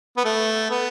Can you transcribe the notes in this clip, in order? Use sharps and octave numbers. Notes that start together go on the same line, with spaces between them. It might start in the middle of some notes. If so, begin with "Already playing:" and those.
B3
A3
B3